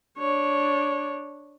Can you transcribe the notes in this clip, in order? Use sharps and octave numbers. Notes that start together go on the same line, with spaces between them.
D4 C#5